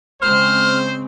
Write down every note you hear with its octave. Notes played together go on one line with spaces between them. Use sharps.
C#3 G#3 C4 C5 F6